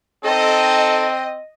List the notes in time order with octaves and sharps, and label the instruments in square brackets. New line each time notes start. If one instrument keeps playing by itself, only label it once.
[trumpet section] C4 G5 [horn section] D#4 A4 [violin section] D#5